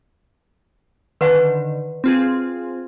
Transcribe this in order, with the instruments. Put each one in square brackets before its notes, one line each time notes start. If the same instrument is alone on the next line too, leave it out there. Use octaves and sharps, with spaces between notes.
[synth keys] D3 D#3 [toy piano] B4 F#5
[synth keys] C4 F4 G#4